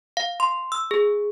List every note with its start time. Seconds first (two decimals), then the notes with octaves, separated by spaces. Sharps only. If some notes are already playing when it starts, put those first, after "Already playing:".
0.17 F5
0.40 C6
0.72 E6
0.91 G#4